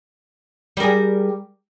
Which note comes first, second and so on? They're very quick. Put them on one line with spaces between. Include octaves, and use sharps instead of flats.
G3 A#4 G#4